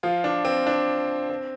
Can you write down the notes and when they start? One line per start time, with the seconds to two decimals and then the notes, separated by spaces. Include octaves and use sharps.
0.03 F3 F4
0.24 D4
0.45 C4
0.67 D4
1.29 C4